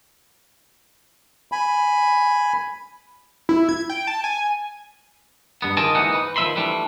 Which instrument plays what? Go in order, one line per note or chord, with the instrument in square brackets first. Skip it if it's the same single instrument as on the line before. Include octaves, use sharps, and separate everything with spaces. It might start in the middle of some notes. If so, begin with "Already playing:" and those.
[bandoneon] G#5 B5
[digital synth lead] E4
G#6
G5
A5
G#5
[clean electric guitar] G2 B3
D#3 F4 G#4 D5 D#5 A5
D#2 G#2 E3 D#4 F#5
B4
D#3 F3 C4 E5 B5 C6
E3 G3 A3 D4